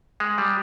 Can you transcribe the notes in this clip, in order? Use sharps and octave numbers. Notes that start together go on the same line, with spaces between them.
G#3
G3